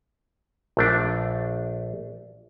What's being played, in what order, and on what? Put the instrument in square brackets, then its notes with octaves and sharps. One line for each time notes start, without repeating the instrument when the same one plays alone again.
[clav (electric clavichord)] A#1 A3 D4